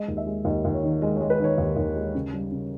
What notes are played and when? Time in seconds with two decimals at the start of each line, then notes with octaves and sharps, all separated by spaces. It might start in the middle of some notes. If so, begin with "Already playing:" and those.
Already playing: G#3 D#5
0.08 D#2
0.17 E5
0.26 G#3
0.45 D#2 D#5
0.65 D#2
0.74 C#5
0.83 D#3
1.02 G#3 D#5
1.16 G#3 C#5
1.30 B4
1.40 D#3 C#5
1.58 D#2
1.76 D#2
1.96 G#3
2.15 C#3
2.33 G3
2.52 C#3